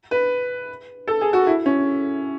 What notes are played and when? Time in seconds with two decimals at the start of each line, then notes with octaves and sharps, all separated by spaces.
0.11 B4
1.08 A4
1.21 G#4
1.33 F#4
1.47 E4
1.66 C#4